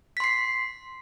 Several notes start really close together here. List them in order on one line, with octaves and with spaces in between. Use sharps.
B6 C6 C7